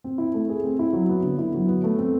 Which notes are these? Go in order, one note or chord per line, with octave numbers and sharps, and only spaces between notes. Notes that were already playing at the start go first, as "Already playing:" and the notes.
C4
E4
A3
G#4
C4
E4
F#3
B3
D3
E4
F#3
B3
A3
C4